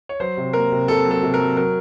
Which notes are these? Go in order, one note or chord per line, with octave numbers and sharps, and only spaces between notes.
C#5
F#3 C5
C3
A#3 A#4
C3
C3 A4
F#3
A4
C3
A#4
F#3
F#3 A#4